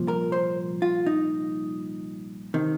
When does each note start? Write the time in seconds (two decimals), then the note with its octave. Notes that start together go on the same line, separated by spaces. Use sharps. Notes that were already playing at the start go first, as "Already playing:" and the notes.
Already playing: C2 A#2 F3
0.08 A#4
0.32 C5
0.82 F4
1.06 D#4
2.54 C3 D#3